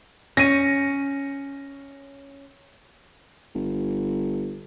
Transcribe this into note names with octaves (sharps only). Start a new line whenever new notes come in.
C#4 A#6 D#7
G1